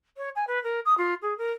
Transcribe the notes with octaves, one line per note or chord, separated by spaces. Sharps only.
C#5
G#5
B4
A#4
D#6
F4
G#4
A#4